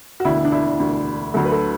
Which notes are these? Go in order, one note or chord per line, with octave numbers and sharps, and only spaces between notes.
F#4
E1 D2 D3 E4
D4
E4
E1 D2 D3
D2 D3 F#3 A3 F#4
B4
A4